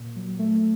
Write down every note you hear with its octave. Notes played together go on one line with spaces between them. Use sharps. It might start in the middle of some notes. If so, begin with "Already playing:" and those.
Already playing: A#2
F#3
A3